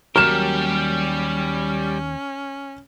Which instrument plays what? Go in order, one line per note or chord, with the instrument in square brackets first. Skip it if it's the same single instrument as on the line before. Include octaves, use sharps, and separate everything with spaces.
[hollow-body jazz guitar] D#2 F#3 A#4 [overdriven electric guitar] G3 G4 [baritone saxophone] C#4 [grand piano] F6 E7